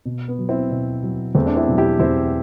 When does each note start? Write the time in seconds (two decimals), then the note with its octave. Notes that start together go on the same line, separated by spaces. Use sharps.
0.05 B2
0.28 B3
0.39 F#3
0.49 C4 E4
0.71 B2
1.03 F#3
1.35 E2 A3 C4
1.46 D4
1.56 C4 E4
1.68 B2 F#3
1.78 E4 G4
1.99 E2 C4 E4